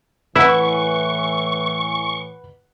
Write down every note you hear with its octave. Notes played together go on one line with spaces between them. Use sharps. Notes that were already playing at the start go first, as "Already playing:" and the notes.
A2 E3 E4 B4 F#5 C#6